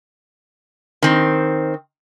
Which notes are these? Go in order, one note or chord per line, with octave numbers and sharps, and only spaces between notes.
D#3 C4